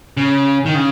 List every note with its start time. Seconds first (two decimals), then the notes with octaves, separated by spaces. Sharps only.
0.17 C#3
0.66 D#3
0.75 C#3